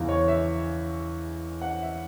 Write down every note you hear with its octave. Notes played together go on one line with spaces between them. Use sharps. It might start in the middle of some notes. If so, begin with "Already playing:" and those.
Already playing: E2 C#3 E3
C#5
E5
F#5
E5